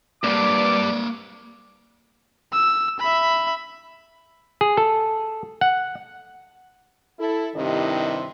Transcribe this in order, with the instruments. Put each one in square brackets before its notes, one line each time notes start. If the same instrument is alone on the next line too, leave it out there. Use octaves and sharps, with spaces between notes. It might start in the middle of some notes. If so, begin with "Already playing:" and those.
[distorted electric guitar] C#2 G2 [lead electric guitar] A#3 B4 [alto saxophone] D5 [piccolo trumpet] D6
[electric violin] E6
E5 B5
[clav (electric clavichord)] G#4
A4
F#5
[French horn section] E4 A4
G2 C3 D#3 E4 D#5